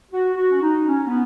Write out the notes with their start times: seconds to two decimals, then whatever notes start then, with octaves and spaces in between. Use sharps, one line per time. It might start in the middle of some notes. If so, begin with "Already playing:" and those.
0.11 F#4
0.36 F#4
0.51 C#4
0.62 D#4
0.88 C#4
1.07 B3